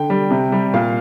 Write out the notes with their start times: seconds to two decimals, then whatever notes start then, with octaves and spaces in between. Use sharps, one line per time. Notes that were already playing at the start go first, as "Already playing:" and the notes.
Already playing: D3 G5
0.10 G3
0.31 C3
0.52 G3
0.74 A#2 F5